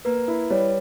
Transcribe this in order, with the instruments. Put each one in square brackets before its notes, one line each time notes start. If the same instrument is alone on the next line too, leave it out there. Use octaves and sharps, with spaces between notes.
[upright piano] A#3 [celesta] B4
[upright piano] E4
[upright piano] G3 [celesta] C#5